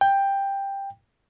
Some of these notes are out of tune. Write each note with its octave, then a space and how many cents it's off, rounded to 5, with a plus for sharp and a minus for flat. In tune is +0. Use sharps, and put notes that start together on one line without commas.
G5 +10